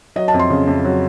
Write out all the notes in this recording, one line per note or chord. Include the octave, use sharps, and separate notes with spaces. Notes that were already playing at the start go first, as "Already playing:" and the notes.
F#3 D#5
A5
F2
C6
C#3
F2
F#3